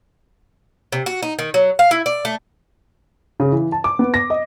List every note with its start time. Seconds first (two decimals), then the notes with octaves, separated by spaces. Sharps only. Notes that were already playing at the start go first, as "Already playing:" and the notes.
0.92 C3
1.06 F#4
1.23 D#4
1.39 D#3
1.54 F#3
1.79 F5
1.91 E4
2.06 D5
2.25 A3
3.40 C#3
3.52 E3
3.72 A5
3.84 D6
3.99 B3
4.14 A#6
4.30 D#5